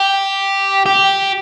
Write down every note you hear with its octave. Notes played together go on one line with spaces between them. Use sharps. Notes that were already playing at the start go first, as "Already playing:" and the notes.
Already playing: G4
G4